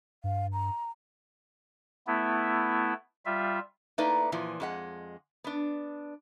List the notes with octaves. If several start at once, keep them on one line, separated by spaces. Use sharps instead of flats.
G2 F5
A#5
A3 B3 E4
G3 F4 E5
A3 A#3 D#4 E4 B4 D5
A#2 E3 F3
F2 G#3 F#5
B3 D4